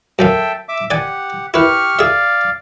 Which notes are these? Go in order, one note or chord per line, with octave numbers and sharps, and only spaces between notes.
F#2 C#4 A4 E5 F5 G5
E5 D6
G4 D5 F#5 G#5
E4 G4 B4 C#6 F6
G#4 D5 E5 F5